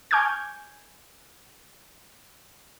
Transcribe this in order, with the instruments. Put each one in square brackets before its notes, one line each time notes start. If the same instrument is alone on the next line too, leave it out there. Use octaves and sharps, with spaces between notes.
[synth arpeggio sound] G#5 C#6 D6 F6 G6 G#6